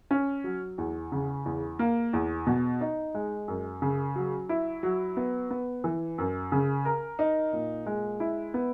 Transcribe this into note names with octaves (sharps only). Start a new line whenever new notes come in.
C#4
F#3
E2
C#3
E2
A#3
E2
B2
D#4
G#3
F#2
C#3
F#3
E4
F#3
B3
B3
E3
F#2
C#3
A#4
D#4
A#2
G#3
E4
B3